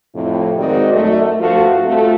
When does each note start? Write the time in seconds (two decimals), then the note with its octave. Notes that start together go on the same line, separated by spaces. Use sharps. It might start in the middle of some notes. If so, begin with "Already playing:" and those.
0.14 F2 A2 C3
0.58 D#3 G#3 C4 F#4 D5 D#5
0.93 F#2 A3
1.40 G2 F3 A3 F4 F#4 A4
1.85 C3 A3 F4